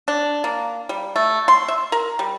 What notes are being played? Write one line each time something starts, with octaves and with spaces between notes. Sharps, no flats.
D4
A#3
G3
A3
C6
E5
A#4
G3